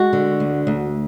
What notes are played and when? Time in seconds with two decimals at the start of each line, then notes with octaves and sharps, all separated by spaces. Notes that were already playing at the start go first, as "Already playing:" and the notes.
Already playing: G#3 F#4
0.13 D3
0.40 D2
0.67 D2